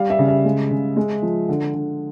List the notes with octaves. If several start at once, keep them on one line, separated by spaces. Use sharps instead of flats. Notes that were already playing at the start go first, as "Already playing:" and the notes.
Already playing: G3 F5
E5
C#3
E5
G#3
C#3
G#3
F3
D3
D3